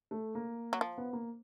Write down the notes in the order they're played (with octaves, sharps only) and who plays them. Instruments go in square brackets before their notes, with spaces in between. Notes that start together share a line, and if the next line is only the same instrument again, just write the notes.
[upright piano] A3
A#3
[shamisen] F#3
F3
[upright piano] B3
A#3